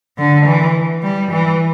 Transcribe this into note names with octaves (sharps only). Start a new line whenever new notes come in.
D3
E3
G3
E3